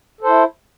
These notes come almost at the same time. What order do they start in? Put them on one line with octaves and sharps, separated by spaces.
A4 C5 E4